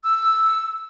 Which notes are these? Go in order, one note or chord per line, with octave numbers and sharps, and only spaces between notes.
E6